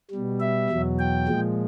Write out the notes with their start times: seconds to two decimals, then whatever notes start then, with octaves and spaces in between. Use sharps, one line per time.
0.11 B2 G3
0.40 E5
0.69 E2 B2 F#3
0.99 G5
1.28 A#2 F3 G#3